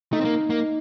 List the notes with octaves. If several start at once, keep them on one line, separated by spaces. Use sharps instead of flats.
A3 D#4
C4
A#3
A#3